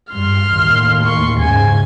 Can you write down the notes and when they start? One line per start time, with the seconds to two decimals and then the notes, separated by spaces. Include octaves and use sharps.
0.12 G2 C6 F6
0.50 D#2 A2
1.02 C6 C#6
1.40 G#2 C#3 G#5